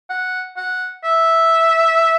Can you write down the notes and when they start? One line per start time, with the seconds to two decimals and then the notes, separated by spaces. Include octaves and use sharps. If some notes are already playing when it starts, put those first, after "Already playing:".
0.10 F#5
0.57 F#5
1.04 E5